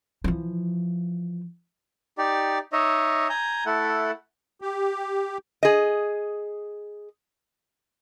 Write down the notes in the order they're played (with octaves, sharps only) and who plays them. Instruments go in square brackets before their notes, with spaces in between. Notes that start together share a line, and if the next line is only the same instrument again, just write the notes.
[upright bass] E3 F3
[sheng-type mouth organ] D#4 G4 D5
D#4 C#5 D#5 E5
G#5 A#5 G6
A3 E4 A4 F#5
[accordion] G4
[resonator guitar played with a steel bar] G#4 D#5